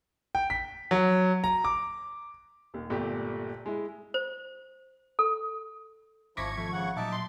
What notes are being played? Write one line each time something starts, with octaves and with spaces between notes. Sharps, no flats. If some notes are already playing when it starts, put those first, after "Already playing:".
G5
B6
F#3
A#5
D6
D#1 D#2
G1 A#2 A3 G4
G#3 E4
C5
A4
G#1 F3 E4 C#6 D6 G#6 A#6 B6
F3 A3
C#3 F#5
A#2 F#3 D#4 E5 A5 D6
C6